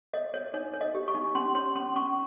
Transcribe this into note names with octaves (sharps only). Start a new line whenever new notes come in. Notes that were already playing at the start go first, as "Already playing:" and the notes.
C#5 D#5
C#5
D#4 C#5
C#5
D#5
G4
C#6
D#4
C#4 C6
C#5 C6
C#4 C6
C#4 C#6